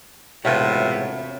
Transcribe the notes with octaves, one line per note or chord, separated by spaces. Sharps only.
E1 A2 C3 F4 B4 C#5 E5 F#5